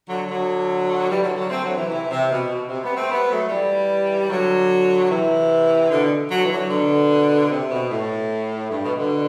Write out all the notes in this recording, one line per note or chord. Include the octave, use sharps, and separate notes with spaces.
D3 F#3
D3 F#3
E3 G3
D3 F#3
D3 F#3
A3 C4
D3 F#3
C3 E3
C3 E3
C3
B2
B2
C3
G3 B3
A3 C4
G3 B3
F#3 A3
E3 G3
D3 F#3
C3 E3
B2 D3
D3 F#3
E3
D3 F#3
B2 D3
C3
B2
A2
G2
B2
B2 D3